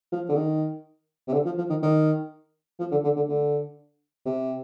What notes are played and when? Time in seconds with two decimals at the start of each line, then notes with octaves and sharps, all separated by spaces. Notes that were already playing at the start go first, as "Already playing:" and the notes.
0.12 F3
0.29 D3
0.36 D#3
1.28 C3
1.33 D3
1.45 F3
1.58 F3
1.69 D#3
1.83 D#3
2.79 F3
2.91 D3
3.04 D3
3.16 D3
3.29 D3
4.26 C3